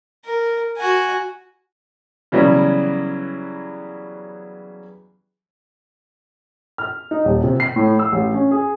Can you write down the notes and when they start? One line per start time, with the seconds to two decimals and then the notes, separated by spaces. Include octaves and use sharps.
0.24 A#4
0.77 F#4 G#5
2.32 C#3 E3 F#3 G3 B3
6.78 F6
7.11 D#4
7.25 D#1
7.43 C3
7.60 C7
7.76 A2
7.99 E6
8.12 A1
8.34 C#4
8.51 G#4